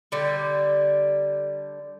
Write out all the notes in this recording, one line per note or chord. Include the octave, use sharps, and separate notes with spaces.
D3 G3